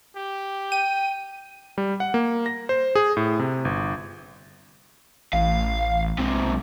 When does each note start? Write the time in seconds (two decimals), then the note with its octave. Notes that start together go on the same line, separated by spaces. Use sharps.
0.16 G4
0.72 G5 D#7
1.78 G3
2.00 F#5
2.14 A#3
2.46 A#6
2.69 C5
2.95 G#4
3.17 A2
3.39 C3
3.65 G1
5.33 A1 F5
6.18 B1 G#2 C3